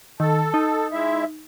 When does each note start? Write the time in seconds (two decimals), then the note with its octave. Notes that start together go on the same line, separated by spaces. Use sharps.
0.20 D#3 A4
0.54 D#4
0.92 G#3 E4 E5